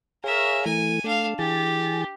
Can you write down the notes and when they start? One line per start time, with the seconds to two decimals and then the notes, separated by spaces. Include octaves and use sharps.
0.24 G#4 A#4 C#5 E5 F5
0.66 E3 A3 G#5
1.04 A3 D4 F5
1.39 E3 G4 G#4 A6